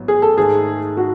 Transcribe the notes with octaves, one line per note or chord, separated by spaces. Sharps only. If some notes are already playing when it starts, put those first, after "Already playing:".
Already playing: A1 G#2 F#3 B3
G#4
A4
G#2 D#3 A3 D#4 G#4 A4
F#4